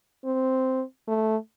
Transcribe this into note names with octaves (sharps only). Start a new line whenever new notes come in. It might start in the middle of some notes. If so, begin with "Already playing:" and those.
C4
A3